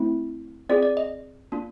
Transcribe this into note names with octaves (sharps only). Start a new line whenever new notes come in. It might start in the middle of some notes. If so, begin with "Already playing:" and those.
Already playing: A3 C4 E4
C4 F4 G#4 D5
D5
D#5
A#3 D4 F4